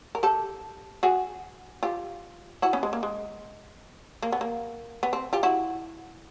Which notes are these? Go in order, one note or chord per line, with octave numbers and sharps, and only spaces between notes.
A#4
G4 A4
F#4 G#4
F4 G4
E4 F#4
B3 C#4
G#3
A#3
G#3
A#3
B3
A#3
B3
C4
F4 G4
E4 F#4